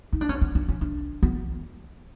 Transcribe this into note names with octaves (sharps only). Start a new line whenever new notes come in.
D#4
D4
C#4
B3
D4
C#4
D4
B3